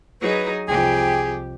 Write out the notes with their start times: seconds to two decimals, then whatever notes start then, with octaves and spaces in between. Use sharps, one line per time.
0.21 F#3 D#4 G#4 B4
0.68 C2 F2 G4 G#4 G5